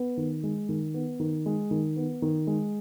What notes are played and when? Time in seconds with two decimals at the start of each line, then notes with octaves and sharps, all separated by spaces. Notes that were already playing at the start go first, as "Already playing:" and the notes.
Already playing: B3
0.17 D#3
0.43 G#3
0.69 D#3
0.94 B3
1.20 D#3
1.46 G#3
1.71 D#3
1.96 B3
2.22 D#3
2.47 G#3